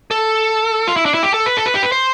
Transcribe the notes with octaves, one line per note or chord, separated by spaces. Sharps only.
A4
F4
E4
D4
E4
G4
A4
B4
A4
B4
G4
B4
C5